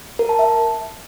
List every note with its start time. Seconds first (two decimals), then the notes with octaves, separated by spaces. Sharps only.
0.19 A#4
0.29 A5
0.39 E5